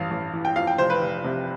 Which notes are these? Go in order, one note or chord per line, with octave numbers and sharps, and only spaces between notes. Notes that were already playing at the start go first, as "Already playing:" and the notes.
Already playing: A1 G2 F5
A1
E3
G5
F2 F5
G5
F1 C5
B4
F1
C3